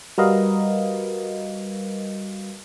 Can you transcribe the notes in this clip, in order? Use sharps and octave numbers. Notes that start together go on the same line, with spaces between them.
G3 F#4 A#4 B4 D#5 F5